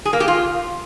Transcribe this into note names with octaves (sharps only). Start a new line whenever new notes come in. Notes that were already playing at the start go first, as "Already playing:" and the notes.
G#4
A#3
G4
F4